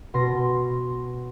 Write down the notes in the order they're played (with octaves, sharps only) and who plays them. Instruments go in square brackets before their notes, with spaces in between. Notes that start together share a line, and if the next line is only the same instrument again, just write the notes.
[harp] B2 C6 A#6